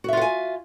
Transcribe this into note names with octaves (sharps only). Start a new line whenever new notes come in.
F4 F#4 E5 F#5 G#5